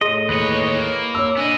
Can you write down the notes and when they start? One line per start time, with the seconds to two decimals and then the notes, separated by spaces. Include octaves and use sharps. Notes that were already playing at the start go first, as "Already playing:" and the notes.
0.01 A2 G#4 D#5 C6
0.29 D#2 B4 C#5 D#5
0.78 A#3
1.15 C#5 E6
1.37 B3 D4 D#5 G#5